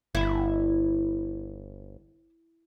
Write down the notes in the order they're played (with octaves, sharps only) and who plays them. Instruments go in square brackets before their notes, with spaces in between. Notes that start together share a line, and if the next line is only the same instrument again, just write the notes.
[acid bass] G1 [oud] E4